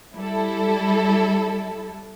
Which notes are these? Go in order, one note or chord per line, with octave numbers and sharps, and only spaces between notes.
G3 E4 A4